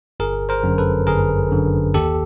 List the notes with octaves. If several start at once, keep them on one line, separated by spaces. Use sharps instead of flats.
G1 G#4 A#4
A#4 C5
F#2 D3
A4 B4
G1 G#4 A#4
F#2 D3
D#2 G4 A4